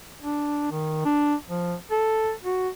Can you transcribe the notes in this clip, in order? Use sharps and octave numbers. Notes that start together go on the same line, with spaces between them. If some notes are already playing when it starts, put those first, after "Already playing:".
D4
D#3
D4
F3
A4
F#4